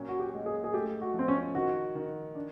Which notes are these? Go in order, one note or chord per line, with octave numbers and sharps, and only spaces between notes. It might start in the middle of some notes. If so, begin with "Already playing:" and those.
Already playing: A#2 F#3 C#4
F#4
G4
G#3
G#4
G#4
A3 G4
F#4
F3
C4
C#4
D#3 F#4
D#3
D4